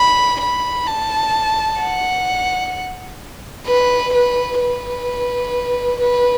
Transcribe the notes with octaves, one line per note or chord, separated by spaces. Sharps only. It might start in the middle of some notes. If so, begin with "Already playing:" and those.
Already playing: B5
B5
A5
F#5
B4
B4
B4
B4